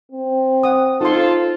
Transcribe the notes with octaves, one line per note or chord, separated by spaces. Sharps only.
C4
F#5 D#6
D#4 F4 A4 C5 C6